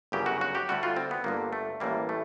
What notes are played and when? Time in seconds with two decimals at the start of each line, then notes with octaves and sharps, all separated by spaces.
0.12 G1 F#2 C#3 F#3 G4
0.26 F#4
0.41 F#4
0.55 G4
0.69 D2 D3 G3 F#4
0.83 F4
0.96 C4
1.11 B3
1.24 G1 G2 D3 A#3
1.53 A3
1.80 A1 A2 E3 G3 A#3
2.09 A3